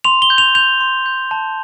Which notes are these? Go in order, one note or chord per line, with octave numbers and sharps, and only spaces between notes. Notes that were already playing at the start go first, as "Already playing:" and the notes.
C6 F7
G7
G6
F7
G6 F7
C6
G6
A5